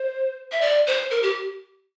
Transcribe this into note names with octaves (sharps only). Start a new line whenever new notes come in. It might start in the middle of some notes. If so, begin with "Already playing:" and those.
Already playing: C5
E5
D5
C5
A#4
G4